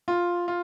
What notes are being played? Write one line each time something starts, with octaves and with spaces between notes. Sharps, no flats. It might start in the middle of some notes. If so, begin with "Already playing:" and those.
F4
F4